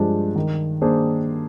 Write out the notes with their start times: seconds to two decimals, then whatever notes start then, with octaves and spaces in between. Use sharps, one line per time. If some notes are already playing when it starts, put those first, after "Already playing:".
Already playing: G2 F3 G#3 D4 G#4
0.36 D#3
0.81 A#3 D4 G#4 C5